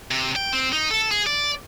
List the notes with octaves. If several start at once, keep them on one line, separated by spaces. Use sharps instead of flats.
C3
G5
C4
D#4
A4
G#4
D5